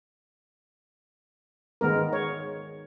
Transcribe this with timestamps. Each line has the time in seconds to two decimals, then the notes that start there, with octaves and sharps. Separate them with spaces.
1.81 D#3 G#3 B3 A#4
2.13 C#5